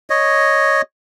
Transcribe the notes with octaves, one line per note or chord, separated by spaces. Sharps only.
C#5 D#5